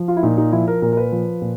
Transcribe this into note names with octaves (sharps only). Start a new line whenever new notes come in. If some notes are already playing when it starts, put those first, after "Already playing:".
Already playing: F3
F4
E4
A#2 D#4
D#4
F3 E4
A#4
A#2 A#4
A#4
B4
F3
A#2